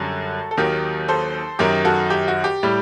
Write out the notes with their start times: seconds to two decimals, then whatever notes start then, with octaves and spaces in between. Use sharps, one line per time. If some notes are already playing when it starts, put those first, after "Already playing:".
Already playing: F#2 D3 G3 F#4 A4
0.51 A4
0.57 D#2 D#3 F#3 G4 A#4
1.08 A4 C5
1.59 F#2 D#3 F#3 G4 A#4
1.85 F#4 A4
2.10 G4
2.28 F#4
2.44 G4
2.63 A2 G3